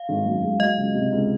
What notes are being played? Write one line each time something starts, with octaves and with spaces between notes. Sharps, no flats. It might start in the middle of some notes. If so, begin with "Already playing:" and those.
Already playing: F5
G#1
F#2
G#3
F#3 D#5
C#2
C3
C#2